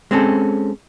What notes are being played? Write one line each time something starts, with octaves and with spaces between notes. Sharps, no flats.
G#3 C4 C#4 A4